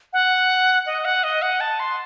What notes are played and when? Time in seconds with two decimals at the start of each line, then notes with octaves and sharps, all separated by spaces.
0.13 F#5
0.86 D#5
1.05 F#5
1.24 D#5
1.42 F#5
1.61 A5
1.80 C6